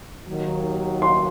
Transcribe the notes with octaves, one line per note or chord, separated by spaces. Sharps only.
D#2 D#3 F#3
C6